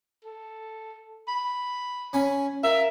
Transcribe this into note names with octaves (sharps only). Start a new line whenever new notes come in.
A4
B5
C#4 G#5 B5
F4 A#4 E5